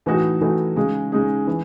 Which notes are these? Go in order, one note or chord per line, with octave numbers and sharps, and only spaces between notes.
A2 E3 A3 D#4 F#4
A2 E3 A3 D#4 F#4
C#3 G#3 D#4 G#4
C#3 G#3 D#4 G#4
E3